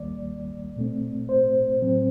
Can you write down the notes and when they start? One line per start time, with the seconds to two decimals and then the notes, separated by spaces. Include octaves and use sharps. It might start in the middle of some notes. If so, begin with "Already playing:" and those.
Already playing: D#2 D#3 G3 A#3 D5
0.76 A#2 A3 C4
1.29 C5
1.82 A2 F#3 C4